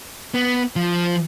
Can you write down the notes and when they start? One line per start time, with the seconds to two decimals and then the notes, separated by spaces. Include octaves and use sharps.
0.34 B3
0.76 F3